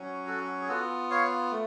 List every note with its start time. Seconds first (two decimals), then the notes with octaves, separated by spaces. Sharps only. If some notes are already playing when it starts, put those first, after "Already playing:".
Already playing: F#3 C#4
0.27 F#4 A4
0.61 G#4
0.68 B3 F4 F#4 A4
1.11 C#5 F5
1.51 A3